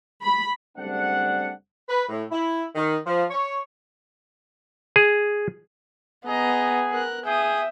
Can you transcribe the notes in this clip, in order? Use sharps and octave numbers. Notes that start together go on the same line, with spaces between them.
B5
F#1 G3 A3 C4 D4 F#5
B4
A2
E4
D#3
F3
C#5
G#4
B3 G#4 D#5 A#5
A#4 F#6
G#4 E5 G5 D#6